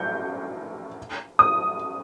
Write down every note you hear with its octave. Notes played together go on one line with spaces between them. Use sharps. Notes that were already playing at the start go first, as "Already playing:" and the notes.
Already playing: G6
D#6